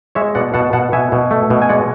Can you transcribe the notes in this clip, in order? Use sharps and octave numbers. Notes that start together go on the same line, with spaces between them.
G#3 C#5 E5
B2 D5 F#5
B2 F#5 A5
B2 F#5 A5
B2 E5 G#5
B2
A3
B2
G#5
G#3 D5 F#5